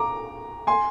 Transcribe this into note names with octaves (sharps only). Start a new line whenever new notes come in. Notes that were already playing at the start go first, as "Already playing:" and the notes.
Already playing: A#5 D6
G#5 C6